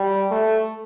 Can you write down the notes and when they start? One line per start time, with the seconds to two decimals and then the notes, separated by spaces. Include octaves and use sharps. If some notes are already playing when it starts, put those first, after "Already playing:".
Already playing: G3
0.31 A3